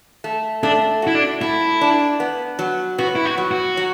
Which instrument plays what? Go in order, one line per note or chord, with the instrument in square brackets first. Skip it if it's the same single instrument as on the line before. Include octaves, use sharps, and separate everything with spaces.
[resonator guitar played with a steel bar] A3
[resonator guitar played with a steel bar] A3 [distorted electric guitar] D4
[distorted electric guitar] E4 [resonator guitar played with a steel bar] F#4
[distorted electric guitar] D4
[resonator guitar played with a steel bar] A3 [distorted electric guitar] E4
[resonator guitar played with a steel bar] D4
B3
F#3
[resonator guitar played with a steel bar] B3 [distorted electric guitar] F#4
[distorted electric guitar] E4
F#4
[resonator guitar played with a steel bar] F#3
[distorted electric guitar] F#4
[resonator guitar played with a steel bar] F#3